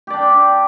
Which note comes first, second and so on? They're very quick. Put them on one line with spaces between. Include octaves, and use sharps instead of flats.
G4 D5 D4 G5